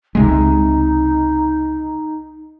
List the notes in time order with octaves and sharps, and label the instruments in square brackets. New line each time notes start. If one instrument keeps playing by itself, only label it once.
[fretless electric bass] C#2 C3 G#3 [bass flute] D#4